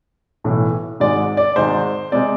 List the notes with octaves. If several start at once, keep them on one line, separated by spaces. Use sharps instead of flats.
B1 A2 E3
G#1 G#2 G#3 D5
D5
G#1 G#2 G#3 C5
C3 G#3 D5